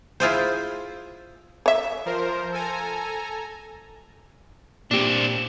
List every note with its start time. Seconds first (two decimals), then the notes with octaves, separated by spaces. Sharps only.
0.20 E4 F4 G#4 C5
1.66 C#5 E5
2.06 F3 A#4 C5
2.52 A4 G#5 A#5
4.91 A#2 C4 D4 G4